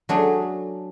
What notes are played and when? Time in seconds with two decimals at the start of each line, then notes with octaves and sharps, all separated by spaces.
0.09 F#3 A3 D4 G#4